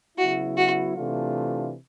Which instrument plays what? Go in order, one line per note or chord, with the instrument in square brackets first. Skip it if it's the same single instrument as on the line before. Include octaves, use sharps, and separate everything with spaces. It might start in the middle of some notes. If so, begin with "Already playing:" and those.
[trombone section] C#3 F#3 B3 E4 [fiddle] F#4
[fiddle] F#4
[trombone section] C3 E3 A3 D4 F4